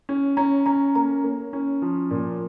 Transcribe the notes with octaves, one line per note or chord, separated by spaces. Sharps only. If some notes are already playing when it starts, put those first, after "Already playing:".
C#4
C#4 A#5
C#4 A#5
A#3 A#5
A#3
C#4
F3
A#2